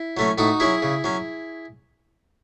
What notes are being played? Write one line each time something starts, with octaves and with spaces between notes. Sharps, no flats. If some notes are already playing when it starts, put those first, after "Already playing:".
Already playing: E4
F#3 A3 C#4
A2 D#4 F#4
F#3 C#4 E4 G#4
C#3
F#3 C#4